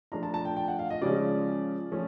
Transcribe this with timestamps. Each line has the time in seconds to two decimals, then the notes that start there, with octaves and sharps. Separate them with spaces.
0.12 F3 A3 D4 F4 A#5
0.23 A5
0.34 A5
0.45 G5
0.56 G5
0.68 F#5
0.79 F5
0.90 D#5
1.02 C#3 F3 G#3 C#4 D5
1.92 F3 A3 C#4